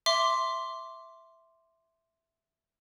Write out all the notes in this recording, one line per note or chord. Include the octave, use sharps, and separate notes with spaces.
E5 C6 D6